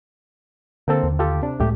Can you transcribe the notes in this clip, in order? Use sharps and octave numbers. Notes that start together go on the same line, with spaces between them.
D3 A#3 C4 A4
D#2 D3
F4 G4 A4
C3 D4
C#2 A2 G#3 A3 G4